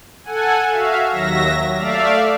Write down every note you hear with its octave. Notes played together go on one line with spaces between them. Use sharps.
A4 F#5 G#5
F#4 E5 F5
D#2 F#3 E5 A#6
A3 D5 E5 F5